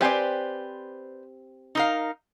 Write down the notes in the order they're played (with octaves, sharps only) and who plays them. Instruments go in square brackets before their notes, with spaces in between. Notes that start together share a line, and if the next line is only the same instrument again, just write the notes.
[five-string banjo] C4 G4 G#5 [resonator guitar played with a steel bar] B4 C5 D5
[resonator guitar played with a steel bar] D#4 A#4 F5